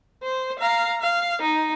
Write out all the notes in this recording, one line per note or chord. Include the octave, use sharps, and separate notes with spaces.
C5
F5 A#5
F5
D#4